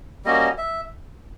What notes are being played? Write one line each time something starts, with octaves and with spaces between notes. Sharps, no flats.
G3 A#3 C#4 F#4 D#5
E5